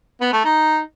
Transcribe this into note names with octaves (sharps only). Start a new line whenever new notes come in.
B3
A3
D#4